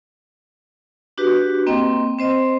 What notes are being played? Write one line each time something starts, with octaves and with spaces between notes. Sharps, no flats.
D4 F#4 G4 B4
A#3 C4 D#5 G5
C4 C5 D#5